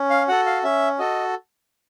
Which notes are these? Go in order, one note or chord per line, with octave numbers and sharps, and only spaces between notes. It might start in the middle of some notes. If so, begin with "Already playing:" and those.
Already playing: C#4
F5
F#4 A4 F#5
F5
C#4 E5
F#4 A4 D#5